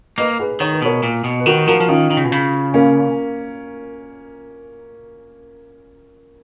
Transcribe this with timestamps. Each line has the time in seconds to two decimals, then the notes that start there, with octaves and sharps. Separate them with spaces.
0.18 A#3 B4 D#5
0.39 G#4 B4
0.60 D#3 C#5
0.73 B4
0.82 B2 A#4 C#5
1.03 A#2
1.24 B2
1.40 B4
1.46 D#3 F#4 A#4
1.67 F3 F#4 A#4
1.80 F3
1.88 D#3 C#4 F4
2.10 D#3
2.17 C#3
2.25 B2
2.32 C#3
2.74 A#3 C#4